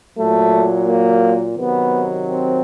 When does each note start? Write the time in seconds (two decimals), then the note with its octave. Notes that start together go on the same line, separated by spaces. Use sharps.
0.18 A#2 F#3 A3
0.87 A#3
1.56 C3 D#3 F#3 B3
2.26 C4